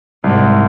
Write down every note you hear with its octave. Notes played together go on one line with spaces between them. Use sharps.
C2 G#2